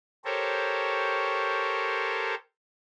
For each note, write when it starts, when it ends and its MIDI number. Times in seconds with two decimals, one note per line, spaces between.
0.25 2.35 67
0.25 2.35 69
0.25 2.35 70
0.25 2.35 72
0.25 2.35 73